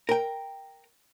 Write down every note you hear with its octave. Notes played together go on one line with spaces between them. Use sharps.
A#4 G5